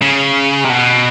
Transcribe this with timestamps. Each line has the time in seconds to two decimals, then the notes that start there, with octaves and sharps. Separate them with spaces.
0.02 C#3
0.64 C3
0.69 B2